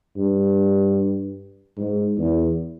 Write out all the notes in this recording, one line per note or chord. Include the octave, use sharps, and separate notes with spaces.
G2
G#2
E2